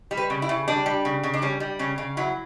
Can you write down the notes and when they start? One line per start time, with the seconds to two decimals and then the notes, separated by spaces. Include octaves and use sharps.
0.11 G3
0.17 B4
0.30 C#3
0.42 E4
0.49 C#3
0.68 G3 D4
0.86 G3
1.05 C#3
1.23 C#3
1.33 D4
1.42 G3 C#4
1.60 G3
1.79 C#3 C#4
1.98 C#3
2.17 F#3 E4